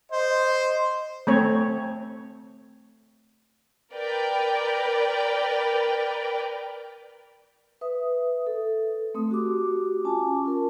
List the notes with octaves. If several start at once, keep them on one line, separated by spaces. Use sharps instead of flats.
C5 D#5
A3 C4 C#5
A#4 B4 D5 G5
B4 E5 D#6
A4
A3 C4 D#6
F#4 G4 D6
C#4 F4 G#5 A5 D6
F4 A#4